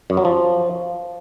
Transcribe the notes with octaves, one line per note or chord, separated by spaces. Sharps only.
F#2
F#3
F3